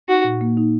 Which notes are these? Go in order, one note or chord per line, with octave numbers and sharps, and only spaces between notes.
D#4 F#4
A#2
A#3
D#4